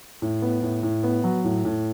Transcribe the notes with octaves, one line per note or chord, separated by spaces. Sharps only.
A2
B3
A2
A2
B3
F#3
A2
A2